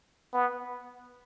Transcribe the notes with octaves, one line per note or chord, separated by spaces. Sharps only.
B3